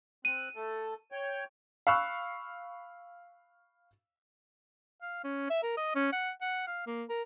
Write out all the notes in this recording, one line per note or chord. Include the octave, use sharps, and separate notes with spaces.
C4 F#6 D#7
A3 A4
C#5 G5
F5 B5 C#6 E6 F#6
F5
C#4
E5
A#4
D#5
C#4
F#5
F#5
F5
A#3
A#4